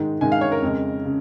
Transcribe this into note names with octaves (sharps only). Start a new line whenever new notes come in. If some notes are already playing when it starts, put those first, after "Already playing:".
Already playing: G#2 D#3 G#3
G#2 D#3 G#3 G#5
F5
C#5
A#4
F2 C#3 G#3
C#3